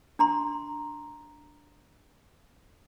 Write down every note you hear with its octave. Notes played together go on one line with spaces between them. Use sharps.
D4 A#5 C6